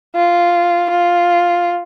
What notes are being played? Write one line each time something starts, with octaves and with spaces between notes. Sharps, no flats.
F4
F4